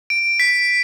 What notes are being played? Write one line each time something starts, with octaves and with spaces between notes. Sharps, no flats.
D7
B6